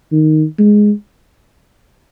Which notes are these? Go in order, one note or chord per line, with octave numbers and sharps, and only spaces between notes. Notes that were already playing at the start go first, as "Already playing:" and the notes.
D#3
G#3